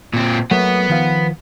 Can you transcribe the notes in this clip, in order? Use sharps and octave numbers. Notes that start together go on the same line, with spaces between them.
A#2 C4
F#3 A3 A#3 B4 F#5
D#3 F3 F5